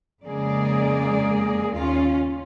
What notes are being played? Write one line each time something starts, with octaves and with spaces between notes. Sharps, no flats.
F2 C#3 G#3 A#3 G#4 D5
D#2 C#4 F4